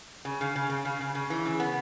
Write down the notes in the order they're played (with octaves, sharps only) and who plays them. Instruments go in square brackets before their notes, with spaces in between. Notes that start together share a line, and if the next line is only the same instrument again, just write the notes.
[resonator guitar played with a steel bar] C#3
C#3
C#3
C#3
C#3
C#3
C#3
E3
C#3
B3